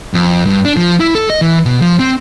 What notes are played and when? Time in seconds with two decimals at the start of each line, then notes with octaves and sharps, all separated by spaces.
0.14 F2
0.46 G2
0.65 D4
0.77 F3
1.00 E4
1.15 A4
1.30 D#5
1.41 E3
1.65 B2
1.80 F3
1.99 C4